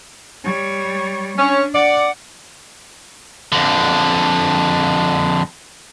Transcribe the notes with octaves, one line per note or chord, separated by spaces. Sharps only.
G3 C#5
C#4 D4
D5 F#5
F2 D3